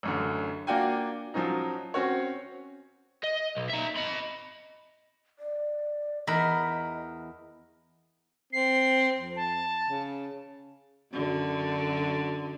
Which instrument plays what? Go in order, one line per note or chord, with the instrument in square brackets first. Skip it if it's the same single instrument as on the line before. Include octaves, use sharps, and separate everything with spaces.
[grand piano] A1 F#2 D3
A#3 D4 F4 F#4 G5 G#5
F3 F#3 C#4 D#4
C4 C#4 F#4 C#5
[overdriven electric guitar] D#5
B1
D#4 E5
D#5 B5
[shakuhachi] D5
[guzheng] E2 A#4 B5 [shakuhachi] D#5
[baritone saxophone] C4 [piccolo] C7
[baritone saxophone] F2
[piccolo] A5
[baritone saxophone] C#3
[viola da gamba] F#2 D3 F#3